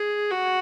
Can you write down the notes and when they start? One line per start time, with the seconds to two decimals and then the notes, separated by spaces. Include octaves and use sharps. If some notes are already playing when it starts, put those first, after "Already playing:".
Already playing: G#4
0.31 F#4